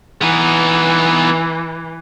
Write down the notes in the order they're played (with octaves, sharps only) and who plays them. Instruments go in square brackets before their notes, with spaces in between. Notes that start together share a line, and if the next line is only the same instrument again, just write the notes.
[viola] E3 [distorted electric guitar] B3 D#4